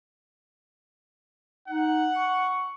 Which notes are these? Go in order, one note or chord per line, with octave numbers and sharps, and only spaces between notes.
D#4 F#5
C#6